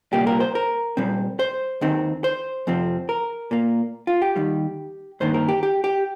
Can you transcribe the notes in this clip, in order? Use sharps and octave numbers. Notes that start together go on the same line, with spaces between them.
C2 A#2 G3 A#3 G4
A#4
C5
A#4
A#2 G3 C4
C5
D#2 D#3 C4
C5
F2 C3 F3 C4
A#4
A#2 A#3
F4
G4
D#2 D#3 G3
G2 D#3 A#3 C5
A#4
G4
G4
G4